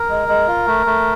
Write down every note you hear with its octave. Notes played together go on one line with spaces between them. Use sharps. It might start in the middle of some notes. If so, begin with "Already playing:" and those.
Already playing: A#4
G#3
G#3
F4
A3
A3